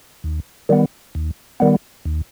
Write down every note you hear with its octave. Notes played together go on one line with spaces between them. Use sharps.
D#2
D#3 G3 B3
D#2
D#3 G3 B3
D#2